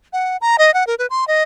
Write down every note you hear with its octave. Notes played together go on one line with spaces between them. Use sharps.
F#5
A#5
D#5
F#5
A#4
B4
C6
D#5